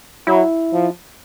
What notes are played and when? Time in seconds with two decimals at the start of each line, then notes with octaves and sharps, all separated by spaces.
0.27 F#3 E4
0.73 F3